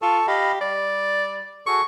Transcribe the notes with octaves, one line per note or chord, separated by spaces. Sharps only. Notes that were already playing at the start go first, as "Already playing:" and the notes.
F4 A4 A5 C#6
G4 D#5 F5 B5
G3 D5
F#4 G#4 A4 C#6